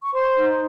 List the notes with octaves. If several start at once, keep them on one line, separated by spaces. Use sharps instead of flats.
C#6
C5 C6
D#4